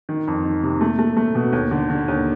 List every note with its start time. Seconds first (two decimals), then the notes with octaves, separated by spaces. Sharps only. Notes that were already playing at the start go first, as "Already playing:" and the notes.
0.09 D#3
0.27 F2
0.44 D#3
0.63 C3
0.81 A3
0.99 A3
1.17 A3
1.35 B2
1.53 D#2
1.71 D3
1.90 D3
2.08 D#2